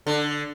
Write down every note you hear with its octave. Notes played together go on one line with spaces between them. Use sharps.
D3